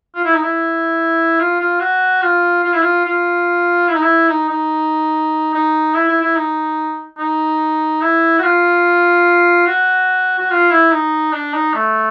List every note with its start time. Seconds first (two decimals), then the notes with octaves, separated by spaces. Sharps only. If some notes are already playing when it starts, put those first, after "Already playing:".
0.15 F4
0.25 E4
0.34 D#4
0.43 E4
1.40 F4
1.60 F4
1.80 F#4
2.22 F4
2.64 F4
2.73 E4
2.82 F4
3.05 F4
3.88 E4
3.95 D#4
4.02 E4
4.29 D#4
4.50 D#4
5.53 D#4
5.94 E4
6.09 E4
6.22 E4
6.36 D#4
7.18 D#4
8.02 E4
8.39 F#4
8.43 F4
9.67 F#4
10.39 F#4
10.50 F4
10.71 E4
10.92 D#4
11.33 D4
11.54 D#4
11.74 A3